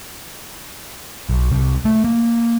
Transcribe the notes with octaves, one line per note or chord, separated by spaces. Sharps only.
B1
C2
A3
A#3